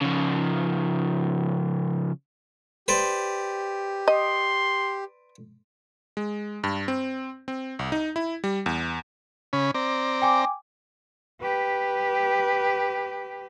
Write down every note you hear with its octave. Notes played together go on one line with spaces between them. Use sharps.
C#3 F3
G4 B4 C5 D5
D#5 C6
G#3
G2
C4
C4
C2
D#4
E4
G3
E2
C#3 C#4 B5
C4 D5 A#5
G5 G#5 D6
G4 B4